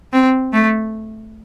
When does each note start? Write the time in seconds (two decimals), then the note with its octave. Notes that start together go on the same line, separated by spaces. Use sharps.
0.13 C4
0.53 A3